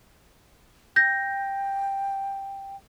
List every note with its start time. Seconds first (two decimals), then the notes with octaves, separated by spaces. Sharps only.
0.96 G5 G6 A#6